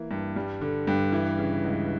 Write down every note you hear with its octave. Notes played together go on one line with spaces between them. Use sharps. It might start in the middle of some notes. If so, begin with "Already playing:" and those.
Already playing: E3 A#3
G2
G3
D3
G2
E3
C#3
C#2